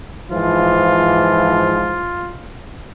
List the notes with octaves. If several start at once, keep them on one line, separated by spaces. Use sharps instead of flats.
G#2 E3 F3 F4